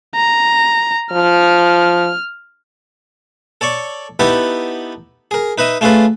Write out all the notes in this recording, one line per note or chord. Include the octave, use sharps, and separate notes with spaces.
A#5
F3 F6
A4 C#5 D5 C#6
B3 D#4 E4 G4 A4 B4
G#4 A#4
D#4 B4 D#5 E5
A3 C#4 F4 G#4 A4 B4